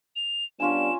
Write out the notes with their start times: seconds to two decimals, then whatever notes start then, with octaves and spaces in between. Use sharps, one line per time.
0.16 F7
0.60 G3 B3 C#4 D4 F4 G#5 E7